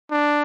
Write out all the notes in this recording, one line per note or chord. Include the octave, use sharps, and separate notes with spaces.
D4